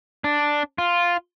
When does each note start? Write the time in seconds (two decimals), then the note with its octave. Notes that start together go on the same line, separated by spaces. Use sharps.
0.24 D4
0.78 F4